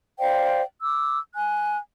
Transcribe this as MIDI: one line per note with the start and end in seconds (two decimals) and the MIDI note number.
0.19 0.62 72
0.19 0.62 74
0.19 0.62 77
0.19 0.62 79
0.82 1.19 86
0.82 1.19 88
1.34 1.76 80
1.34 1.76 90